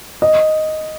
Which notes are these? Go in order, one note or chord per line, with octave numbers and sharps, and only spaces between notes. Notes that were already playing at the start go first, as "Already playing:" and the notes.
D#5